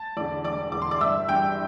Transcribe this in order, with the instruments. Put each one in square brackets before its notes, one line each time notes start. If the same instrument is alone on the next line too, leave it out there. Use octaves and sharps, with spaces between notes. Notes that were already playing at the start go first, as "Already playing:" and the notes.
Already playing: [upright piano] A5 A6
E2 D3 D5 D6
E1 D5 D6
E2 D3 D6
C6
D5 D6
G1 E5 E6
G2 E3 G5 G6